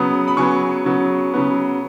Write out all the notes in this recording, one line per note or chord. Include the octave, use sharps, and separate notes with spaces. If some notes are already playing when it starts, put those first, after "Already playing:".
Already playing: C#3 F#3 B3 D#6
B5
C#3 F#3 B3 G#5 C#6
C#3 F#3 B3
C#3 F#3 B3